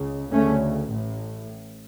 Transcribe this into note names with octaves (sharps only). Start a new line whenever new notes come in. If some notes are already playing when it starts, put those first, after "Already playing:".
Already playing: C#2 C#3
D2 C#3 A3 C#4
A1 A2